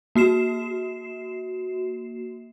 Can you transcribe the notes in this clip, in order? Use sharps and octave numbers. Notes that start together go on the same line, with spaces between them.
A#3 F#4 C7 E7